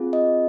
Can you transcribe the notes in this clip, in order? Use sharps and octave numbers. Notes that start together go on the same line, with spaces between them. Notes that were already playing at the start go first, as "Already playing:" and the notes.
Already playing: C4 F4 G#4
D#5